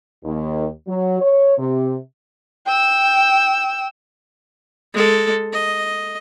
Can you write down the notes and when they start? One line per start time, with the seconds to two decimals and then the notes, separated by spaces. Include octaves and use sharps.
0.24 D#2
0.87 F#3
1.20 C#5
1.58 C3
2.66 G5 E6
4.94 G#3 A4
5.53 D#5